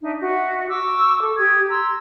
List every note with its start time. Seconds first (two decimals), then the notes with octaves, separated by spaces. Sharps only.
0.02 D4 D#4 E5
0.20 F#4 D#5 E5
0.69 C#6 D6 E6
1.20 A4
1.38 G4 D#6 G#6
1.69 A#5 C6 E6